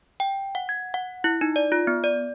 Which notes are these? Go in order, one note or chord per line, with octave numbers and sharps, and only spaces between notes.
G5
F#5
G#6
F#5
E4
D#4
D5
F4
B3
D5